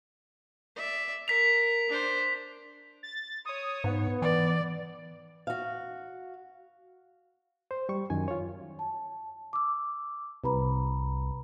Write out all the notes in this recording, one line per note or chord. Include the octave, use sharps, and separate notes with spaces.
D5 E5
A#4 B6 F7
D4 C5
A6
C#5 D#6
G#2 B3
E3 D5
F#4 F5
C5
G3 C#6
F#2 D#3 G#5
F4 C#5
A5
D6 E6
C2 B4 A#5 B5